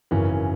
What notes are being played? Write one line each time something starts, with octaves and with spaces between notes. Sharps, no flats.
G#1 F#2 C#3 E3 C#4